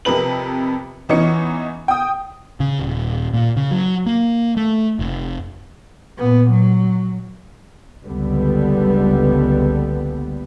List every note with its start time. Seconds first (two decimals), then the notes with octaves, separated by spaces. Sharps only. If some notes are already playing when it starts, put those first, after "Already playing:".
0.05 F2 C3 A#4 B4 F#7
1.09 E2 E3 C#4 D#4 C#7
1.88 G5 D#6
2.60 C#3
2.79 D#1
3.34 A#2
3.57 C#3
3.71 F#3
4.06 A#3
4.57 A3
4.99 F1
6.19 A#2 B3
6.50 F#3
8.05 F#1 C#2 D3 G3 B3